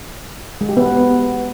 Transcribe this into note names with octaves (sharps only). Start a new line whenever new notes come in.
G#3
G4
B3